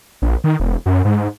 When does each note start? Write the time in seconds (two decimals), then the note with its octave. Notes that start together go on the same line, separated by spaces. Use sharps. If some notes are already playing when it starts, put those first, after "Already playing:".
0.22 A#1
0.44 D#3
0.59 E1
0.86 F#2
1.05 G#2